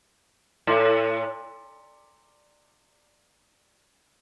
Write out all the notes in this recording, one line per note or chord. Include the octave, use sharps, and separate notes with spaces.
A2